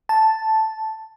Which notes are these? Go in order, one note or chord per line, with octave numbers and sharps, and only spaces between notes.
A5